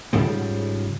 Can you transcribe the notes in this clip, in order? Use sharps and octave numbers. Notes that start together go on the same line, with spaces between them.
G#2 C#3 F3 G3